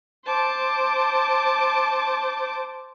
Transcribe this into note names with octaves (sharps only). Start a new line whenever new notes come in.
C5 A5 D6